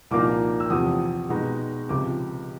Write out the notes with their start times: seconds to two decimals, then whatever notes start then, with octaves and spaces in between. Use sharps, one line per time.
0.11 C2 A#2 F3 A#3 D#4 D6
0.60 E6
0.70 E2 C3 F3 D#6
1.29 B2 G#3 B3 D#4
1.89 C#2 C3 F3 D6